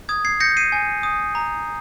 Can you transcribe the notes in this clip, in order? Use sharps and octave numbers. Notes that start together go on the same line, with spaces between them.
D#6 G#6
G#6 C7
G6 A#6 C#7
C7 D#7
G#5
D#6
A#5